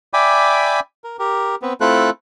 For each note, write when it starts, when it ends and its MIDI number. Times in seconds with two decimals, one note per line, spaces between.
0.14 0.80 74
0.14 0.80 76
0.14 0.80 79
0.14 0.80 80
0.14 0.80 83
0.14 0.80 86
1.04 1.17 70
1.19 1.55 67
1.19 1.55 70
1.62 1.73 59
1.62 1.73 60
1.81 2.10 57
1.81 2.10 60
1.81 2.10 64
1.81 2.10 65
1.81 2.10 69
1.81 2.10 90